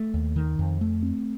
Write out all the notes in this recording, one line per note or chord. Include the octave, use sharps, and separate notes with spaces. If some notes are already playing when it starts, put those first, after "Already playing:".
Already playing: A3
D#2
D#3
F2
A3
C4